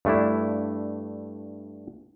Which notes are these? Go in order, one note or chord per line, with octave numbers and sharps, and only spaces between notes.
G2 A3 D4 E4